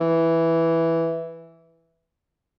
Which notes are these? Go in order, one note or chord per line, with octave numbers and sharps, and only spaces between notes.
E3